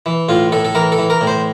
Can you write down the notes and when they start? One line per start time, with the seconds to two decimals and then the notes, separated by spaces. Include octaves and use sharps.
0.06 E3
0.29 A2 F4
0.52 A2 A4
0.65 A4
0.75 E3 A#4
0.92 A4
0.99 E3
1.10 A#4
1.21 A2
1.27 C5